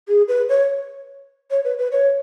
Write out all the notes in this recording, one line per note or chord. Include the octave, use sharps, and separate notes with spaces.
G#4
B4
C#5
C#5
B4
B4
C#5